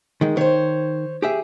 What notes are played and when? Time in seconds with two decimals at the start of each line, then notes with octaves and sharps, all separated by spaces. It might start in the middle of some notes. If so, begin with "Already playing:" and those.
0.21 D#3 G#3
0.37 D#3 C5 C#5
1.22 G4 G#4 E5